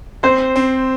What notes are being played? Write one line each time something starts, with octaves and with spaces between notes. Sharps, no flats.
C4 C5
C4